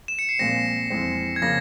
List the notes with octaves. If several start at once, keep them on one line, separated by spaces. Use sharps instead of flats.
E7
C#7
C7
A#2 F3 G#3 C4 A#6
F2 E3 G#3 C4
G#6
C#3 F3 A#3 A#6